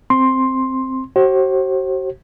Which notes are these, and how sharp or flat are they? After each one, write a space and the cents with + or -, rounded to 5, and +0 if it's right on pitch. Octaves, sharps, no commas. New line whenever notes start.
C4 +0 C6 +10
F#4 +45 C5 +35